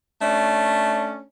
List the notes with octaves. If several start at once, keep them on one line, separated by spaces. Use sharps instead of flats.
A3 C#4 D4